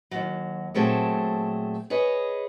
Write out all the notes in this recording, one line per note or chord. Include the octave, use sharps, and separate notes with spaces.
D#2 F#3
A#2 F#3 A3 C4 G#4 A4
G#4 B4 C#5 D#5